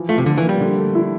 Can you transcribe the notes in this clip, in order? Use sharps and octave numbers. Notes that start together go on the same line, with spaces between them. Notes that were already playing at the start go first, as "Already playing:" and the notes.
Already playing: E3 F3
A3 F4
C3
D3 F3
E3
A#3
G3
D3
A3
E4